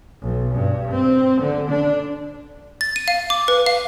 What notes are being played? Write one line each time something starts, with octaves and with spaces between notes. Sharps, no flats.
B1
G2
C4
D3
D4
A6
D#7
F5
D6
B4
F5